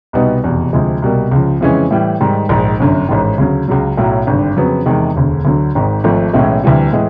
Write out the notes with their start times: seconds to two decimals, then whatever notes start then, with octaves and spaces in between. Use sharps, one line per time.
0.13 C2 B2 G3 B3 D#4
0.44 F1 E2 B2
0.73 D2 C3 F3 G#3
1.02 C2 B2 G3 A#3
1.31 C#2 C#3 F3
1.61 F2 C#3 E3 G#3 C#4
1.91 A2 E3 G3
2.20 G#2 D#3 G3
2.49 A#1 G#2 D#3
2.80 G1 F#2 D3
3.09 A1 G#2 D#3
3.38 D2 C#3 F#3
3.68 C#2 C#3 F#3
3.97 B1 A2 F#3
4.27 G#1 G2 D3
4.57 F2 C#3 F#3 B3
4.86 E2 C3 D#3 G#3
5.16 E1 D2 D3
5.45 D2 D3 F#3
5.75 G#1 G#2 D#3
6.04 G#1 G#2 F3 A3
6.33 B1 A2 E3 G#3 C#4
6.64 D2 C3 E3 G3
6.93 A2 E3 G#3